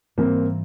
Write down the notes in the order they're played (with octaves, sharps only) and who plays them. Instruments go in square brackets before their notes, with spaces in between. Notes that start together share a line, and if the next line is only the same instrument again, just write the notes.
[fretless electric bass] G#2 E3 G3 [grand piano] A#3 C4